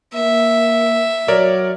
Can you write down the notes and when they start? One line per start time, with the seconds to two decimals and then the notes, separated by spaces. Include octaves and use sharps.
0.14 A#3 E5
1.28 F#3 A#4 C#5 D5